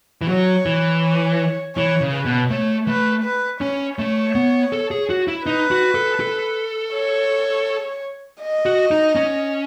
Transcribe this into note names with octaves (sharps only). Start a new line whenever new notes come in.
E3
F#3 C#5
E3
C#5
E3 C#5
C#3
B4
B2
A3 C#5
A3 B4
B4
C#4 C#5
A3 C#5
B3
A4
G#4
F#4
E4
D#4 B4
F#4
A4
A4
C#5
D#5
F#4
D#4
C#4